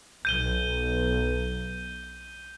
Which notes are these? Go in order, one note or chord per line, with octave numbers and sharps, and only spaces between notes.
B1 G6 D#7 G7